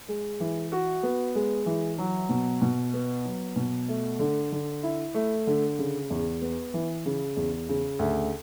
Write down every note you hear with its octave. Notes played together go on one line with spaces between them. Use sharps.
G#3
E3
F#4
B3
G#3
E3
F#3
B2
B2
B3
F#3
B2
A3
D3
D3
E4
A3
D3
C#3
E2
B3
E3
C#3
E2
C#3
D2